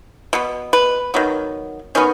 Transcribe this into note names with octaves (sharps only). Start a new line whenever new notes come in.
B2 B3
B4
D#3 F#3 B3
D#3 F#3 B3 C#4